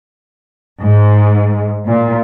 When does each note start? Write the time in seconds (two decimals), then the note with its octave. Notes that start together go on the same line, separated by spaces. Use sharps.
0.83 G#2
1.87 A#2